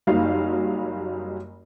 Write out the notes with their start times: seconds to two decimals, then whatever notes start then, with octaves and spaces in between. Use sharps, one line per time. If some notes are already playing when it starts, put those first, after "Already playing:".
0.07 F#1 F#3 G3 D#4 F5